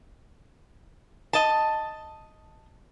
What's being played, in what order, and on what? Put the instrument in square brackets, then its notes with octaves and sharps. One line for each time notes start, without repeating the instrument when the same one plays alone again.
[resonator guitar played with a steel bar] D#5 A5